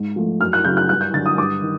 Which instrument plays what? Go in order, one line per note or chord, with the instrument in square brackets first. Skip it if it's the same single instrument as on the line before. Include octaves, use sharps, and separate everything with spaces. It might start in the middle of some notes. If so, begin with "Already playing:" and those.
Already playing: [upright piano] G#2
F3 A3
F#2 F6
F#6
C#3 F#3 G6
F#6
G2 F#6
G6
D3 A6
F#3
D#6
G2 D6
D#3